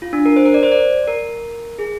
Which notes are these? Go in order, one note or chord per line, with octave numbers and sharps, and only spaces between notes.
F4
D4
A#4
C5
A#4
D5
C5
D5
A#4
G#4